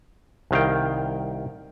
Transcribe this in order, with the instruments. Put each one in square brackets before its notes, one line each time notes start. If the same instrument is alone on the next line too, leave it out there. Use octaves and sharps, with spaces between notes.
[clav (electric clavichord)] C2 D#3 F5 G5